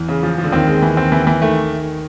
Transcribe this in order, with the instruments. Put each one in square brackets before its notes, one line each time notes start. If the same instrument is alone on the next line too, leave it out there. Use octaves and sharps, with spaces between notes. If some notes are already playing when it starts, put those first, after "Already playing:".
Already playing: [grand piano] E2 E3
[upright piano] C#3
F3
F3
[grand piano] D3
[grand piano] D#2 D#3 [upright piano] C4
[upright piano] G#3
E3
C4
E3
E3
[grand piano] D#3 [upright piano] A3